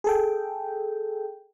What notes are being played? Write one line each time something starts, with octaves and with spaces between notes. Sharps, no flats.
G#4 A4 G5